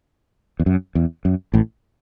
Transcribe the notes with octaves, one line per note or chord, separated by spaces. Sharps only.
E2
F#2
E2
F#2
A1 A2